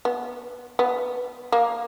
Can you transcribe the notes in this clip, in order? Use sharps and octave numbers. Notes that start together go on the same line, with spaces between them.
B3
B3
A#3